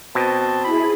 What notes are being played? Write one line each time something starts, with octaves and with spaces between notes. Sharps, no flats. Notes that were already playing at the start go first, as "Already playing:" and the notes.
B2 C4 A5
E4 G#4 B5